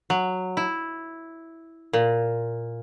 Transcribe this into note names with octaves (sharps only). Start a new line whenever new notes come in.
F#3
E4
A#2